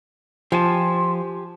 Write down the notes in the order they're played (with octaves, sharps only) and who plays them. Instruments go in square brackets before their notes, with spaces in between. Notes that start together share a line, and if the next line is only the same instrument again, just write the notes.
[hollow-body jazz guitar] F3 [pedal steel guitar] G4 G#5 A5 [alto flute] C6